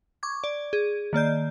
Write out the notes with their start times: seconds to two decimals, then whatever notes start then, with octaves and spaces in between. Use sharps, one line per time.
0.23 C#6 D6 G#6
0.44 D5
0.73 G#4
1.13 D#3 A#3 D5 G6